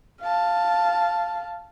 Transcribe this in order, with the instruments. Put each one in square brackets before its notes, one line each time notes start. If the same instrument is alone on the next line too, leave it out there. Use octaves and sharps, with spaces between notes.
[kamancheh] F5 A5